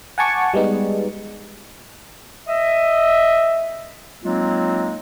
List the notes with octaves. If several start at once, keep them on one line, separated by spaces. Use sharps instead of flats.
F#5 G#5 A5 C#6 D6
G3 G#3 B3 D#4
D#5 E5
F#3 G#3 A#3 C4 D#4 F4